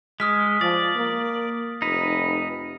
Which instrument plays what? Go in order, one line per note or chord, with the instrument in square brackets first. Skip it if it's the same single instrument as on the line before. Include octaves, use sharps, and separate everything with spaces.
[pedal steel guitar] G#3 [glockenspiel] D#6 F6 B6
[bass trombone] F3 [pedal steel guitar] D5 [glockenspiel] A6
[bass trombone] A#3
[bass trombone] F1 [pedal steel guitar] D#4 B4